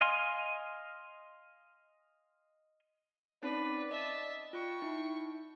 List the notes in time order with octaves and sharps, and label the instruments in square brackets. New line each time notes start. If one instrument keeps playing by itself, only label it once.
[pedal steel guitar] D#5 F5 G#5 C6
[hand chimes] C4 C#4 D#4 [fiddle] B4 [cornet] D5
[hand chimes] D#5 [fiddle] E5 A5
[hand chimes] F4 [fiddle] G5 C#6
[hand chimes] D#4 [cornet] E4